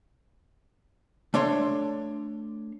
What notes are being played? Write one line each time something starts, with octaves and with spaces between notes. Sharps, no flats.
A3 D4 C#5 C6